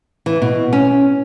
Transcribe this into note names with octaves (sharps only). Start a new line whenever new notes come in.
E3
B2
C#4